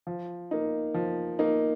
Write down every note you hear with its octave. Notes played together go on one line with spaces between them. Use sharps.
F3
A#3 D#4
F3
A#3 D#4